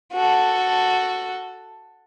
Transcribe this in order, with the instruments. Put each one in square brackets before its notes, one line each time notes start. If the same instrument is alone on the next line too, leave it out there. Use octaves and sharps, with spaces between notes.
[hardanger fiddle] F#4 A4